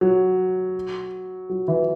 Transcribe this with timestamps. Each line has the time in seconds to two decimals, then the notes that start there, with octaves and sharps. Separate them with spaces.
0.01 F#3
1.49 F#3
1.68 E3